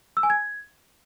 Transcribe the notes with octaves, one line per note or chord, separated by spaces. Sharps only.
E6
G#5
G#6